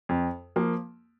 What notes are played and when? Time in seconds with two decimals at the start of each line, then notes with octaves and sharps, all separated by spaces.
0.09 F2
0.56 F3 A#3